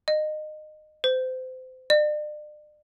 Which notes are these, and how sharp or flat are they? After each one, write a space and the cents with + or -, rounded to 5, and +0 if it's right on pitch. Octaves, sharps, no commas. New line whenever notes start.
D#5 -25
C5 -30
D5 +40